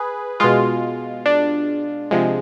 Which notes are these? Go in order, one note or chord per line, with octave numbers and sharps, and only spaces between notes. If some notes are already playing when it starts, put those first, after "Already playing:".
Already playing: G#4 B4
B2 G#3 F4
D4
C3 F3 G#3